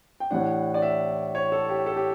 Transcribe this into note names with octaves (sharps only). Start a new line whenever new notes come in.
G5
A2 E3 G3 D4 F#5
D5
E5
C#5
A4
G4
A4
G4